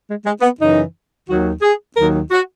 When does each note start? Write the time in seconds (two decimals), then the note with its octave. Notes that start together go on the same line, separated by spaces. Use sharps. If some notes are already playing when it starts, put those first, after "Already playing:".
0.08 G#3
0.25 G#3
0.41 B3
0.59 F#2 C#3 E3 D#4
1.28 D#2 D#3 F#3 F#4
1.62 G#4
1.95 D#2 D#3 F#3 A#4
2.31 F#4